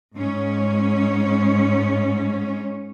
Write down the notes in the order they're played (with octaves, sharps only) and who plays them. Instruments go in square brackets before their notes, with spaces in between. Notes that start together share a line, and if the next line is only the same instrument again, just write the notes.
[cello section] G#2 C#4